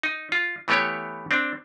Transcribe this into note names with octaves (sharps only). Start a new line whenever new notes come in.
D#4
F4
E3 A3 B3 G4 C#5
C4 D4